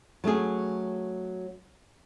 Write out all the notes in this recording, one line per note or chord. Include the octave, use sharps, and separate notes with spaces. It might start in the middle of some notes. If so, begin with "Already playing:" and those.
F#3 A3 C#4 G#4